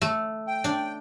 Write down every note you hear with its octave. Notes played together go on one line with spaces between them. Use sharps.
A3
G5
D4